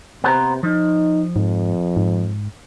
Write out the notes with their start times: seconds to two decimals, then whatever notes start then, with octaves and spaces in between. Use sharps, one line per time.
0.24 C3 B3 C5 A#5
0.63 F3 D#4
1.36 F2 G#2
1.97 G#2